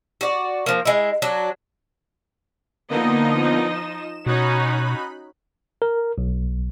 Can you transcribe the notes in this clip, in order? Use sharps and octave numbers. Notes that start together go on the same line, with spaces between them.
F#4 D5
F3 A#3
G#3 E4
F#3 D4
D3 F3 A#3 B3 D#4 D#5
E7
B2 C#4 D#4 F#4 B5 F#6
A#4
B1